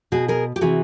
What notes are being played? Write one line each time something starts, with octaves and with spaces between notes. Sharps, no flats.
B2 F#4 G#4
G#4 A#4
G4
C3 E3 F#4 G#4